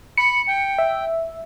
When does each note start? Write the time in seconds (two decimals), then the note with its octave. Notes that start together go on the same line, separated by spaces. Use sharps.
0.18 B5 C#7
0.47 G5
0.79 E5